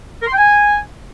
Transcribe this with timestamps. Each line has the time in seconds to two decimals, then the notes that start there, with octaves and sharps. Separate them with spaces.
0.22 A#4
0.27 C6
0.32 G5
0.38 G#5